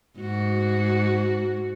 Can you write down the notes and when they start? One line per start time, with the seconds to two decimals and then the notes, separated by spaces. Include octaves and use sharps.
0.19 G#2 F#4